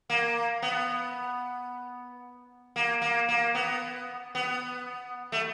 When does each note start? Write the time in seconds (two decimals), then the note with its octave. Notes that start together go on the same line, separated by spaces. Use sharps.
0.10 A#3
0.62 B3
2.76 A#3
3.02 A#3
3.29 A#3
3.55 B3
4.35 B3
5.32 A3